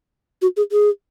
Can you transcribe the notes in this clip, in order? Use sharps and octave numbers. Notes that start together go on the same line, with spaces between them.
F#4
G#4
G#4